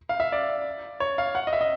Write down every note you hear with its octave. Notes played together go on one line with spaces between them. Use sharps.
F5
E5
D5
C#5
F5
F#5
D#5
E5
D#5